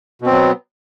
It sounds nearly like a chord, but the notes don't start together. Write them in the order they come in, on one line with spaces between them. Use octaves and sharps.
B2 C4 F#3 B3